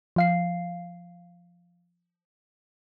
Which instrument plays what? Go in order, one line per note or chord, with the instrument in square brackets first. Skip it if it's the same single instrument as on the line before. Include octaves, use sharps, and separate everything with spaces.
[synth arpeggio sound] F3 F5 C7